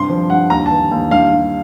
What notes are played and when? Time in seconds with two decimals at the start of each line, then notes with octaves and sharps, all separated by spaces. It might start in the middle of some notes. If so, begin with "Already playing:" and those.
Already playing: G2 C3 C6
0.10 F3
0.30 G2 F#5
0.50 D#2 A#5
0.66 E3 A5
0.91 D#2
1.11 G2 F5
1.32 G2